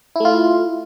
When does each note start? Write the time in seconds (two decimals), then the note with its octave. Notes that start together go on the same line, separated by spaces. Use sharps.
0.16 E4
0.20 A3
0.25 F4